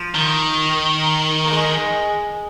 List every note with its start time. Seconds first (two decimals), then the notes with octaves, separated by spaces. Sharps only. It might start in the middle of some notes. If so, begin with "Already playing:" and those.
Already playing: F3
0.14 D#3
1.46 A#3
1.51 G#3